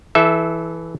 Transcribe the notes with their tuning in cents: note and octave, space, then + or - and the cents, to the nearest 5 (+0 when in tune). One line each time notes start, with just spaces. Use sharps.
E3 +0 A4 -25 E5 +0